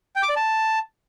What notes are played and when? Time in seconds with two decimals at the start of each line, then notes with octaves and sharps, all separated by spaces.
0.16 G5
0.23 D6
0.29 D5
0.36 A5